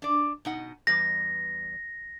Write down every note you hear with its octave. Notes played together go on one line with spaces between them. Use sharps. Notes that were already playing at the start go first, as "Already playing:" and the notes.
D4 D5
B2 D#4 F#5
E2 G3 B4 A#6